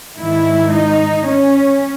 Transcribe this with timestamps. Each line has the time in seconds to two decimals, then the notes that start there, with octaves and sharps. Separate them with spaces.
0.18 G#2 D#3 E4
0.73 D#4
1.27 C#4